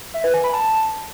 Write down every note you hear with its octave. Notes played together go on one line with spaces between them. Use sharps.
E5
B4
G#5
B5
A5